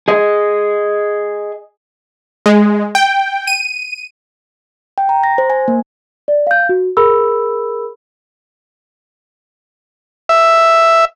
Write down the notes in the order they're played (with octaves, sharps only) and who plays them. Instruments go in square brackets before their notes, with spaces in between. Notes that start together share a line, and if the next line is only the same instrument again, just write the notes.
[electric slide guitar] G#4 D#5
[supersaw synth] G#3
G5
D#7
[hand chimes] G5
A#5
A#6
C5
G#5
A#3
[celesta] D5
F5 G6
F#4
G#4 A#4 B5 E6
[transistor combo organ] E5